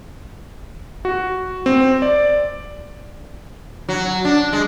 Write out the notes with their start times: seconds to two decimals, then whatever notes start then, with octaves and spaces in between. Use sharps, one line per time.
1.05 F#4
1.66 C4
2.02 D5
3.89 F#3
4.25 D4
4.53 G#3